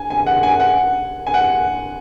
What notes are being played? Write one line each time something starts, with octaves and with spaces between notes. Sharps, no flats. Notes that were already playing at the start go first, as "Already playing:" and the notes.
Already playing: G#5
G#5
F#5
G#5
F#5
G#5
F#5